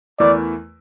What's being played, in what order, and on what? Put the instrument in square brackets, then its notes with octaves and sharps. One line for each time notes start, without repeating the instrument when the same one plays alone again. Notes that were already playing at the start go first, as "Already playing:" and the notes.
[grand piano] E2 E3 A3 E4 A#4 [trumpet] D5